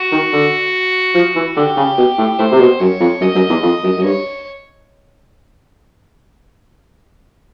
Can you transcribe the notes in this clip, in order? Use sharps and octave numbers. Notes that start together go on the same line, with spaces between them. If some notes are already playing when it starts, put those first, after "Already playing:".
Already playing: F#4
D#3
D3
F3
E3
D3 G4
C#3
B2
A2
A2 C5
C3
B2
F#2 C#5
F2
F#2 D#5
F#2
E2
F2
F#2
F#2
G2 C#5